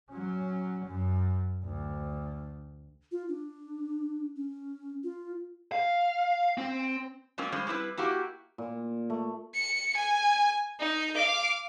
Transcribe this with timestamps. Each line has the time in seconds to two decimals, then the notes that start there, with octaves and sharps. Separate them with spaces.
0.11 F#3 C#4
0.86 F#2
1.64 D2
3.12 F4
3.29 D4
4.36 C#4
5.04 F4
5.72 F5
6.58 C4
7.38 F#3 G#3 A#3 C4 C#4 F4
7.52 G3 G#3 C#4 F4 C5
7.67 G3 C4 E4 B4
7.97 A#3 E4 F#4 G4
8.58 A#2
9.10 A3
9.54 C#7
9.96 G#5
10.80 D#4
11.16 F5 D6